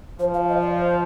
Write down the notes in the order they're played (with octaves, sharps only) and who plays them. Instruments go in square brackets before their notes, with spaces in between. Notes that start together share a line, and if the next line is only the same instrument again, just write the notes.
[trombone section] F3 [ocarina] C5
[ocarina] F5
D#5
D5
C5